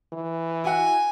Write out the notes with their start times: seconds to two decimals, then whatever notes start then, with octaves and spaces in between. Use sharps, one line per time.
0.13 E3
0.64 E4 F#4 F#5 G#5